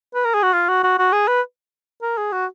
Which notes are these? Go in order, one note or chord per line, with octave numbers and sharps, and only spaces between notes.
B4
A#4
G#4
F#4
F4
F#4
F#4
F#4
G#4
B4
A#4
G#4
F#4